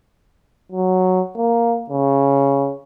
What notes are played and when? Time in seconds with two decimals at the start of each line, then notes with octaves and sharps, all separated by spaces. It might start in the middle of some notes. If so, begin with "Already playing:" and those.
0.72 F#3
1.37 A#3
1.90 C#3